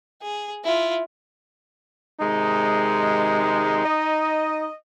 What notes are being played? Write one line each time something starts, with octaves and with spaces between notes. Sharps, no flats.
G#4
E4 F4
C3 D#3 G#3 D#4
D#5